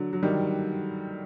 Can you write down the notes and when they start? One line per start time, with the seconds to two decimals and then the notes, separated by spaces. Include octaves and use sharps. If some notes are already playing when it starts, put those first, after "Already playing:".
Already playing: D3 F#3
0.13 F#3
0.23 D#3 G3